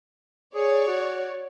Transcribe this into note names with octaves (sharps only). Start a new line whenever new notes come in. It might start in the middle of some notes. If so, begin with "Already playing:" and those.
G#4 C#5 D5
F#4